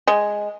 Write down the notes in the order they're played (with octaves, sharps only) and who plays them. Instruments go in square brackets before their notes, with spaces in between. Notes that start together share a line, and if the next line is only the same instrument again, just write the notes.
[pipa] G#3